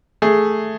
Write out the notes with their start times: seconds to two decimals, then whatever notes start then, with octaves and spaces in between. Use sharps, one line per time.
0.22 A3 G#4